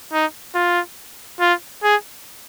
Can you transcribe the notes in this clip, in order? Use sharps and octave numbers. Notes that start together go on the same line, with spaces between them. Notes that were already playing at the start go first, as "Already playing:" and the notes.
D#4
F4
F4
G#4